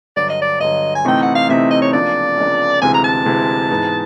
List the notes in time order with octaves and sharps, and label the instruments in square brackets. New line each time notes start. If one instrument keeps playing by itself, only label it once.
[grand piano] G2 D3 F#3 [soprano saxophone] D5
[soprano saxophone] D#5
D5
[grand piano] G2 D3 F#3 [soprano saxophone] D#5
[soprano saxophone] G#5
[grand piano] C3 E3 A3 C4 D#4 [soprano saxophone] G5
[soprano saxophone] F#5
F5
[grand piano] C3 E3 A3 C4 D#4 [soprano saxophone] E5
[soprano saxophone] D#5
C#5
[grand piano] C#2 C#3 F3 A#3 D4 [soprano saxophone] D5
[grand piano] C#2 C#3 F3 A#3 D4
[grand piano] D2 C3 E3 G#3 [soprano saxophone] G#5
[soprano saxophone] A#5
A5
[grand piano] D2 C3 E3 G#3
G#2 E3 G#3 B3 D#4